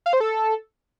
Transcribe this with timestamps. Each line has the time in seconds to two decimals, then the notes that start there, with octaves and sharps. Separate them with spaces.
0.06 F5
0.13 C5
0.20 A4